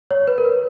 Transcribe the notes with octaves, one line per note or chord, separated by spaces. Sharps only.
C#5
B4
A#4
B4